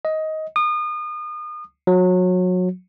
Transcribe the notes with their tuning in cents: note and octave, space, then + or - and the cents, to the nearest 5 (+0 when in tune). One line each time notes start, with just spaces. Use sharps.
D#5 +15
D#6 -35
F#3 -25